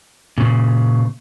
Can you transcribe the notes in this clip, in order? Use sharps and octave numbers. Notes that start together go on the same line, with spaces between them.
A#2 C#3